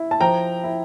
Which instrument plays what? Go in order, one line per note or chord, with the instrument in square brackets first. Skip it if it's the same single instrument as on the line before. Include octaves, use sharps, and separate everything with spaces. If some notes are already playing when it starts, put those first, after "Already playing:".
Already playing: [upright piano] E4
A5
F3 G5 A#5
E4